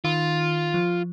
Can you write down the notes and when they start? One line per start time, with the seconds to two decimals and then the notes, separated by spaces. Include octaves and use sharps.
0.04 D#3 F4
0.74 F3